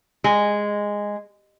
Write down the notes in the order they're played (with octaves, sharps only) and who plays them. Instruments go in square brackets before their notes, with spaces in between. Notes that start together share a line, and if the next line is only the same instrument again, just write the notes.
[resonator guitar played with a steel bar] G#3